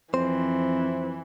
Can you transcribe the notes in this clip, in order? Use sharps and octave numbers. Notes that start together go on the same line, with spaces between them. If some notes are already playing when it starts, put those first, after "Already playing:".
F2 E3 C4 C5